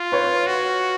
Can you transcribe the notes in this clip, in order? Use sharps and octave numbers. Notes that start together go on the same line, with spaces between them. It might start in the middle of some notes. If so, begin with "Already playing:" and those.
Already playing: F4
B4 C#5
F#4